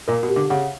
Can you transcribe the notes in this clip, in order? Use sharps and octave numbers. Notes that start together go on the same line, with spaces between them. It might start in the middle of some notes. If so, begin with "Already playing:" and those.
A#2 A#4
B2
G4
D3
C#3 F#5